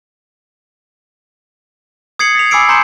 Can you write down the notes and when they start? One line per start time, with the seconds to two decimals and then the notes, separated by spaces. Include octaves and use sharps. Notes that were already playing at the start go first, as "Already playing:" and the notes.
2.19 D#6 G#6 C7 C#7 F#7
2.35 A6 B6 F7
2.51 G#5 B5 D6 E6 C7 D7
2.69 A#5 C6 G6 C#7 E7